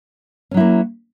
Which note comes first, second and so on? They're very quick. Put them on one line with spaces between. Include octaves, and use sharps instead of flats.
C#4 F#3 E4 A#3